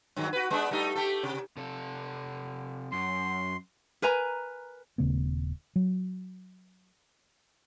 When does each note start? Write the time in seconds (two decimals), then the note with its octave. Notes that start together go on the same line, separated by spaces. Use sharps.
0.16 G2 D#3 F#3
0.33 F#4 B4
0.50 G#3 B3 D4
0.71 G3 A3 D#4
0.95 A3 G4 A4
1.23 C3
1.57 C3 A4
2.92 F#2 C6
4.02 A#4 B4 G#5 A#5
4.98 D#1 C#3 A3 B3
5.76 F#3